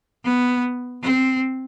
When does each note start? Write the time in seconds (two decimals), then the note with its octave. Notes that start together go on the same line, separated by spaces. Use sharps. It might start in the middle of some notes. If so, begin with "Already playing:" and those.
0.24 B3
1.02 C4